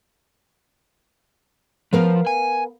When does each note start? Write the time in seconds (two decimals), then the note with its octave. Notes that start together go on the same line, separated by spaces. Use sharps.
1.93 F3 B3 A#4 F5
2.27 G#5